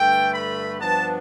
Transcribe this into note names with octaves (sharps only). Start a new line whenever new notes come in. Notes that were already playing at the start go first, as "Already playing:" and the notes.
Already playing: G2 D3 A3 G5
B5
G2 F3 B3 D4 A5